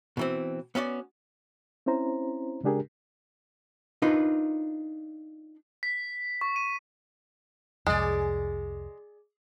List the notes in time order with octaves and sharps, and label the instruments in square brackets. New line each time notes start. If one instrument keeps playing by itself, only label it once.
[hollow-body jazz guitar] B2 E3 C4
B3 C#4 F#4 D5
[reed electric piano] C4 C#4 E4 C5 A#5
C#3 G#3 D4 G4 G#4 A#4
[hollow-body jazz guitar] D4 D#4 F4 A#4 B4
[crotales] B6
C#6
D#7
[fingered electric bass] C2 F2 [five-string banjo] G#3 [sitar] G#4 D5